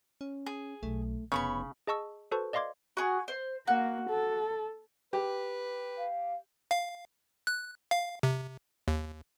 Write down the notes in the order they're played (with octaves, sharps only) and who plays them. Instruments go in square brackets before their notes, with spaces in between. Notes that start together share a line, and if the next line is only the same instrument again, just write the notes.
[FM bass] C#4
[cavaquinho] G#4
[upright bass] B1 [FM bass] A3
[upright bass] F1 [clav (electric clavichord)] C#3 [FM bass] B3 [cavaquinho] C#5 B5 C#6
[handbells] G#4 D#5 A5 C#6 E6
F#4 A4 B4 C5 A5 C#6
D5 D#5 F5 C6 D6 G#6
[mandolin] F#4 G#4
C5
[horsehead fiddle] A#3 [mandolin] F#4
[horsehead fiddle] A4
[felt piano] G4 [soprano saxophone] B4
[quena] F5
[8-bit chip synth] F5
F#6
F5
C3
D#2